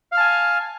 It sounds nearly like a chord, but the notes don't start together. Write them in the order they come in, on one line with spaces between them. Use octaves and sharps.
F5 F6 A5 G#5